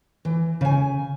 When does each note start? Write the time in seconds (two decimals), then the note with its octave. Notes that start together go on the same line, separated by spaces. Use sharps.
0.25 E3
0.61 C#3 G#5